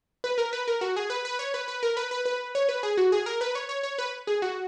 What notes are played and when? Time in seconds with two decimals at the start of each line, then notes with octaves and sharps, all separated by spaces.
0.24 B4
0.38 A#4
0.53 B4
0.68 A#4
0.81 F#4
0.96 G#4
1.10 B4
1.25 B4
1.39 C#5
1.54 B4
1.68 B4
1.83 A#4
1.97 B4
2.11 B4
2.25 B4
2.55 C#5
2.69 B4
2.83 G#4
2.97 F#4
3.12 G#4
3.26 A#4
3.41 B4
3.55 C#5
3.69 C#5
3.83 C#5
3.98 B4
4.27 G#4
4.42 F#4